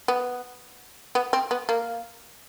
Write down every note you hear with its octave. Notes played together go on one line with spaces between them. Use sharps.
B3
B3
C4
B3
A#3